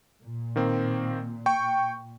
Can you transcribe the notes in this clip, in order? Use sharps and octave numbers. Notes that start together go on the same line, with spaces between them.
A#2
D#3 A#3 C4
G5 C#6